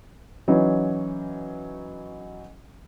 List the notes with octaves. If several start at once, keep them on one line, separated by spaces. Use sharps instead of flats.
E3 F#3 C#4 D#4